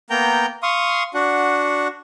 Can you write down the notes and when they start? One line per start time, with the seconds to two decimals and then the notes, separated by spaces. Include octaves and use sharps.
0.10 A#3 B3 G5 A#5 G6
0.63 F5 C6 C#6 D#6
1.14 D4 F#4 F#5